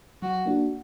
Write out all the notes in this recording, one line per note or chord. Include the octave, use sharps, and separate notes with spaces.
F#3 F#4
A#3 D4 F#4